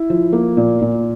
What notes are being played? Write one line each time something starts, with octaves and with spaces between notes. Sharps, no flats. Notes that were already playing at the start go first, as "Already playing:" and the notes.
Already playing: E4
F3
A#3
A#2
A#2